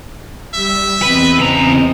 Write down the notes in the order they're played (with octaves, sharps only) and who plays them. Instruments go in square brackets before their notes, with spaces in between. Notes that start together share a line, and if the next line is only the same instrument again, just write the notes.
[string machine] G3 [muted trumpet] E5
[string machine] E2 C4 D#5 [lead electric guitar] B4
[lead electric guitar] C#3 A#5